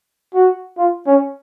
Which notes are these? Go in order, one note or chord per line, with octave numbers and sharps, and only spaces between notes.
F#4
F4
C#4